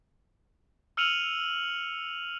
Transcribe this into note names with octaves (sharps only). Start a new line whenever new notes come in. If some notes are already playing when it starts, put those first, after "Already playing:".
E6 F6 C#7 D#7 F7 F#7